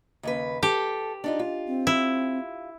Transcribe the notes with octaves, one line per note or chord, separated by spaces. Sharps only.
D#2 C#3 B4
G4 A4
D4 D#4 F4
F4
C4
E4